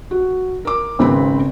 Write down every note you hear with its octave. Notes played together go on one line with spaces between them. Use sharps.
F#4
A#4 D6
G#1 C#3 C4 B4 B5